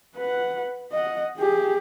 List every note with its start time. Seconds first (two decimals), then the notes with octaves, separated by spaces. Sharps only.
0.15 B4 F#5
0.92 D#5 F#5
1.37 G4 G#4